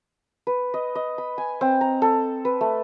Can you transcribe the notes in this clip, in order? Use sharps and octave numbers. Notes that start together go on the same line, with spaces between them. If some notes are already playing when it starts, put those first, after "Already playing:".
B4
D#5
D#5
B5
G#5
C4
A#5
A4
B4
A3